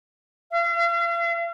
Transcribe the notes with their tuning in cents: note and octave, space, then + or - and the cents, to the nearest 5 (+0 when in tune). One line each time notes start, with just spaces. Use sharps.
F5 -45